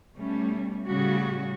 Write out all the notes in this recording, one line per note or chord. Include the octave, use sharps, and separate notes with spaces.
B2 G3 A3 C#4
A2 C#3 G3 F#4